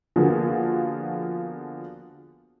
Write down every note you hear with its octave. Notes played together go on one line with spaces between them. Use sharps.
D3 F3 A#3 B3 F#4 G#4